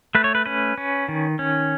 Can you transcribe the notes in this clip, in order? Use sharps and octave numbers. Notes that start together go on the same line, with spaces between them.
A3 B4
C#5
B4
C#4 B4
C#4
D#3
C#4